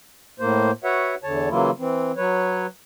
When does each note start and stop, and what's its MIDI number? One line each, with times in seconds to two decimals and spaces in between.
0.40 0.71 45
0.40 0.71 58
0.40 0.71 72
0.84 1.15 66
0.84 1.15 71
0.84 1.15 73
0.84 1.15 76
0.84 1.15 78
1.24 1.49 40
1.24 1.49 50
1.24 1.49 73
1.24 1.49 81
1.50 1.71 49
1.50 1.71 52
1.50 1.71 54
1.50 1.71 58
1.50 1.71 64
1.50 1.71 65
1.79 2.12 52
1.79 2.12 60
2.17 2.66 54
2.17 2.66 71
2.17 2.66 73